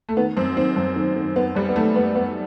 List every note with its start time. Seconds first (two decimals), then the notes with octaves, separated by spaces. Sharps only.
0.09 A3
0.17 D#3 B3
0.37 F#2 C4
0.57 D#3 C4
0.76 F#2
0.96 D#3
1.16 D#3
1.36 D#3 B3
1.55 F#2 G3
1.69 B3
1.75 D#3 A3
1.96 F#2 B3
2.15 F#2 B3